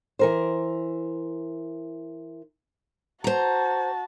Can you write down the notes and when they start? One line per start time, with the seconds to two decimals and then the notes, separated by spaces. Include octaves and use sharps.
0.19 E3 A#4 C5
3.24 F#4 C5 A5 A#5